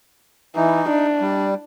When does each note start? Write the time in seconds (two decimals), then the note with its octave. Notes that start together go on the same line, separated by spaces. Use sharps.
0.56 E3 D#4
0.89 D4
1.21 G3